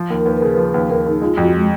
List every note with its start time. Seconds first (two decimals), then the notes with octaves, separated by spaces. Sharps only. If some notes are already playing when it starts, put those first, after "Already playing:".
Already playing: F3
0.10 D#2 A#4
0.25 D#2 B4
0.37 A#4
0.42 C#3 B4
0.57 F3
0.74 D#2
0.89 D#2 A#4
1.06 C#3 D#4
1.21 G#3 F4
1.32 F4
1.37 F2 F#4
1.55 G#3